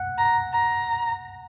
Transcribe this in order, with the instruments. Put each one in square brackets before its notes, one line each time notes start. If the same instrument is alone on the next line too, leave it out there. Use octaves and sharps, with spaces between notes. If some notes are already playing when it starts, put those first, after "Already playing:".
Already playing: [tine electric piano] F#5
[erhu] A#5
A#5